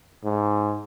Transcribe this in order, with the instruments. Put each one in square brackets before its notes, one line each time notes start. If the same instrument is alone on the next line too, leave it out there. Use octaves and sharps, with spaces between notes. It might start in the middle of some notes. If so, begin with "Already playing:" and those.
[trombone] G#2